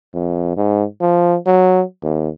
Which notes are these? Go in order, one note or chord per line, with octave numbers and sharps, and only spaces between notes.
F2
G#2
F3
F#3
D#2